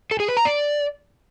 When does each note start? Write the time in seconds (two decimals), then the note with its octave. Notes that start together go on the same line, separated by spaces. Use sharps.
0.11 A4
0.20 G#4
0.28 B4
0.37 A#5
0.45 D5